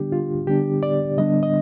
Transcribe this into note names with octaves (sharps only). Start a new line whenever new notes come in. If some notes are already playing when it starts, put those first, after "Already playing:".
Already playing: D3 G3 B3 D4 G4
F4
D3 G3 B3 D4 G4
D5
D3 G3 B3 D4 D#5
D#5